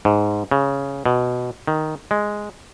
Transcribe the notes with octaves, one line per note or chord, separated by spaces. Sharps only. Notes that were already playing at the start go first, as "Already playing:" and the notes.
G#2
C#3
B2
D#3
G#3